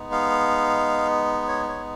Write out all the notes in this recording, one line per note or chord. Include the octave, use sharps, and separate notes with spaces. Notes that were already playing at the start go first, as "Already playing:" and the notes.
Already playing: G#3 B3 D#4
F5
C#5
C#5